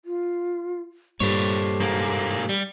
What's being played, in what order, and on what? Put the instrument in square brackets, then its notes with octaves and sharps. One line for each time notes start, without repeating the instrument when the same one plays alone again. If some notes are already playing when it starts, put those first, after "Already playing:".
[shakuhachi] F4
[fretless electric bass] G2 A#2 [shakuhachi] G4 [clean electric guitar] A4 C5 C#5
[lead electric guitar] G#2 A#3
[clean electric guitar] G3